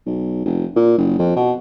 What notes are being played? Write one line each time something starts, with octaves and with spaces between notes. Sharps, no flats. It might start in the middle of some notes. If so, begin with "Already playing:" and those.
B1
F1
A#2
F#1
F2
B2